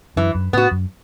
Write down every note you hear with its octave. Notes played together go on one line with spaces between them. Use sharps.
F#2 E3
F#2
A2 B3 F#4
F#2